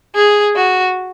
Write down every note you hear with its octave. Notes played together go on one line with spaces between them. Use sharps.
G#4
F#4